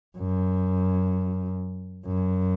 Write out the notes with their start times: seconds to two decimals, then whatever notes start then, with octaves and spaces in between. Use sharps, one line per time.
0.18 F#2
2.06 F#2